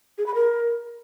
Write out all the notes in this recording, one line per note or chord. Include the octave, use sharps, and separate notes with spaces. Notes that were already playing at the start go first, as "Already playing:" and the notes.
G#4
B5
A#4